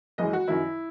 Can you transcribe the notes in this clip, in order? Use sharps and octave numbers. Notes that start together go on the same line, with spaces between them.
F#1 F#2 E3 G#3 D#5
F#4
F#2 D#3 F#3 E4